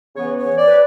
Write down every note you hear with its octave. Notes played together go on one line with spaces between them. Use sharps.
C#3 E3 B3 C#5
C#5
D5
B4